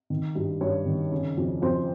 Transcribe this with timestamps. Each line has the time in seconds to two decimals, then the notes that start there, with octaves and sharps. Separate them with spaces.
0.10 D#3
0.35 G2
0.61 G2 C#5
0.86 D#3
1.12 C#3
1.37 F2
1.62 F2 C5